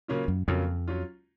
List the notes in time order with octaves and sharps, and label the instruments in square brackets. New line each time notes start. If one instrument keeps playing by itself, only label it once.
[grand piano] C#3 F#3 A#3 C#4 F4
[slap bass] F#2
[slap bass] F2 [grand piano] C#3 F#3 A#3 C#4 F4
[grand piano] F#3 C#4 F4